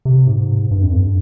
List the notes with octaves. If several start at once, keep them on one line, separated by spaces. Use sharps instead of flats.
C3
G#2
G2
F2
G2